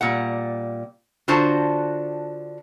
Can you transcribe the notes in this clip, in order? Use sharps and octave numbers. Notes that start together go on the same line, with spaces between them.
A#2 G3 F#5
D3 D4 F4 F#4 C5 A5